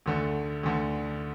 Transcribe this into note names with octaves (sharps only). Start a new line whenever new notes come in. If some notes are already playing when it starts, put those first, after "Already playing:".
D2 D3 A3
D2 D3 A3